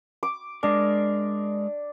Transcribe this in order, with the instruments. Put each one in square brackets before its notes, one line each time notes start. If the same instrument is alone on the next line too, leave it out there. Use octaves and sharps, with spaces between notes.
[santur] D6
[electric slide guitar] G#3 A#4 [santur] D4